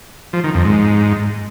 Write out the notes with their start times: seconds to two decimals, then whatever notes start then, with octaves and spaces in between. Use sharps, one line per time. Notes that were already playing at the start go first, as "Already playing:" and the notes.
0.33 F3
0.44 D#3
0.54 F2
0.65 G#2